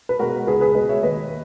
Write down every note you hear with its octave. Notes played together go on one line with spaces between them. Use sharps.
B4
B2 G#3 F#4 A#4
C#2 G#4 B4
G#4 B4
B2 G#3 B4 D#5
C#5 E5
D#2 B4 D#5